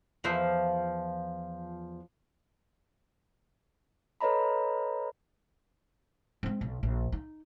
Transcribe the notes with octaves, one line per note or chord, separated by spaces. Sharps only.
E2 F3 E5
A4 B4 C#5 D#5 A#5 B5
G#3 C4
B1
A#1
D#4